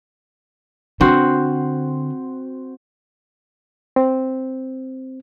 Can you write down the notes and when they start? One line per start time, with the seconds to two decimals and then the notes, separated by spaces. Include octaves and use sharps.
1.01 D3 C4 F#4
3.96 C4